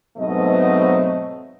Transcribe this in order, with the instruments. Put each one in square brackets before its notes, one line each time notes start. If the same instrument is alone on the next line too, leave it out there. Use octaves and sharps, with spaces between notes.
[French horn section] G#2 B2 F#3 A3 C4 D#5